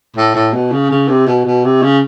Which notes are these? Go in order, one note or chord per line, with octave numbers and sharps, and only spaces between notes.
A2
A2
B2
C#3
C#3
C3
B2
B2
C3
C#3